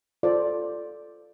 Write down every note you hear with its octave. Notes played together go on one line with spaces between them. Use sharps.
F4 A4 C5 D5